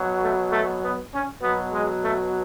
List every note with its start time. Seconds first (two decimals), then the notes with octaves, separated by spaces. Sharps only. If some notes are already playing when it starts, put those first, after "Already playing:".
Already playing: B2 F#3
0.22 A3
0.52 A3
0.82 B3
1.12 C#4
1.42 B2 F#3 B3
1.72 G#3
2.02 A3